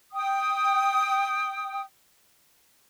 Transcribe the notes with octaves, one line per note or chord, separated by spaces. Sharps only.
G5 D#6